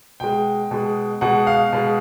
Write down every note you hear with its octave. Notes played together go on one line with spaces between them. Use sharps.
B2 G#3 G5
B2 G#3
B2 G#3 F#5
F5
B2 G#3